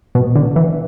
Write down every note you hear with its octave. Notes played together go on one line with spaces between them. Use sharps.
B2
D3
E3